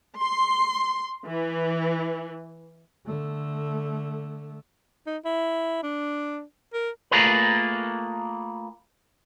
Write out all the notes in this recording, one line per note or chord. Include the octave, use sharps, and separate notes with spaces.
C6
E3
D3 A3
D#4
E4
D4
A#4
A3 A#3 F4 G#4 A#4 B4